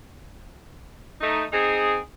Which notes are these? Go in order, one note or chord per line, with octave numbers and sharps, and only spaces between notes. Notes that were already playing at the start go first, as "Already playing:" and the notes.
A3 D#4
C4 D#4 G#4